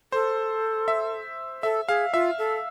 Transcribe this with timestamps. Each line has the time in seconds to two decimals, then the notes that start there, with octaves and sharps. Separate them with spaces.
0.12 A4 C5
0.88 E5
1.63 A4 E5
1.88 G#4 F5
2.13 F4 E5
2.39 A4